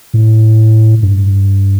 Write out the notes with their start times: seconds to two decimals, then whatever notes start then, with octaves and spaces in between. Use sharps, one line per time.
0.14 A2
1.02 G2